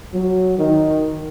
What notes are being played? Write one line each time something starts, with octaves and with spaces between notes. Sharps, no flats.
F#3
D#3